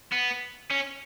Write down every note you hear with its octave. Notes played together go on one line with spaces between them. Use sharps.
B3
C#4